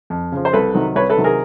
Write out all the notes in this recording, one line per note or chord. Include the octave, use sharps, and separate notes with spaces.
F2
C#3 F3
C5
C2 A4 B4
C3 D#3 F#3
C2 B4 C#5
A4 B4
C3 D#3 F#3
G#4 A#4